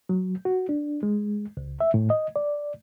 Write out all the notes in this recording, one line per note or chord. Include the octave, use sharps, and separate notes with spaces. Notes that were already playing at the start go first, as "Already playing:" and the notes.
F#3
F#4
D4
G#3
C#2
E5
A2
D#5
D5